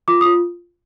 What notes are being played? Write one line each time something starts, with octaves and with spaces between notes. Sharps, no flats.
F4 D6
D#6
F4